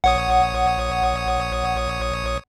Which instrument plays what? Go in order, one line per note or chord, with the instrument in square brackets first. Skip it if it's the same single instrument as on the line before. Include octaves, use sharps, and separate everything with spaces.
[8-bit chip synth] A#1 C#5 D#6 [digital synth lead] F#5